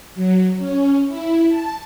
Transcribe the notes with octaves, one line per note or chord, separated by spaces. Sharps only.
F#3
C#4
E4
A5